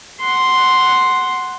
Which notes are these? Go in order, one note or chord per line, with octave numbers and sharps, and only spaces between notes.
F#5 C6